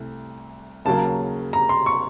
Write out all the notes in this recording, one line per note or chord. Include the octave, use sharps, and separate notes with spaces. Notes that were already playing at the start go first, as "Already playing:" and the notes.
Already playing: C2 C3 A3
D#2 C#3 F#3 A#3 A5
A#5
C6
C#6